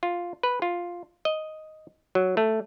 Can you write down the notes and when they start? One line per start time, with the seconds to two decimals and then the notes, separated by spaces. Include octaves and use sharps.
0.03 F4
0.43 B4
0.62 F4
1.25 D#5
2.15 F#3
2.37 A3